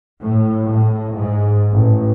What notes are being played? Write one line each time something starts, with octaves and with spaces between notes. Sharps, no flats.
A2
A2
G#2
A1